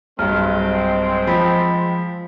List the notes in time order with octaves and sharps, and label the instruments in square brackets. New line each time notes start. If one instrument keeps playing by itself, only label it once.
[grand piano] B1 G2 [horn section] G#3 C4 [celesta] F6
[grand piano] F3 [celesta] B5 B6